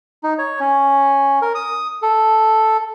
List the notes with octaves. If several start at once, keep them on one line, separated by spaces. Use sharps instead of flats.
D#4
C#5
C#4
A#4
D#6
A4